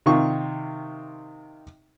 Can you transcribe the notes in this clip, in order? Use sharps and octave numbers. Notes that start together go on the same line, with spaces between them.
C3 D#3 F4 C#6